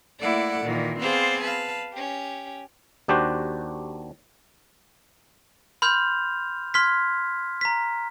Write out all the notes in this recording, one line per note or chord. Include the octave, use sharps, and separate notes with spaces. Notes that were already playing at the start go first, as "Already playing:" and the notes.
A3 A#3 E4 A4 D5 F#5
A#2 D#3 E3
B3 C4 G#4 C5 D5 F5
B4 F5 A5
C#4 G4
D#2 D4 F#4 G4 C5
B5 C6 F6 G6 F7
C6 F6 G#6 B6
A#5 B6